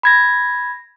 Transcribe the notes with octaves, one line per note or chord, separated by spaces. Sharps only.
B5 G#6 A#6